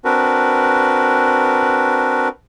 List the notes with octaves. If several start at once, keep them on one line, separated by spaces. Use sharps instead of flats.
C4 D4 F#4 A#4 B4